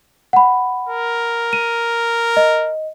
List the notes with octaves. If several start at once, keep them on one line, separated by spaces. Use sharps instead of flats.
F#5 B5
A#4
D#7
D#5